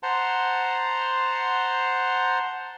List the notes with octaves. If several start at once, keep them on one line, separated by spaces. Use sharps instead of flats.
C5 F#5 A5 A#5 C6